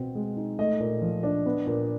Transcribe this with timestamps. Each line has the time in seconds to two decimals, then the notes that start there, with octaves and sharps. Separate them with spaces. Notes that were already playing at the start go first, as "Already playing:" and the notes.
Already playing: B2 C4
0.15 G#3
0.36 D#4
0.59 A3 D#5
0.80 A#2
1.01 F3
1.23 D4
1.46 B3
1.66 A#2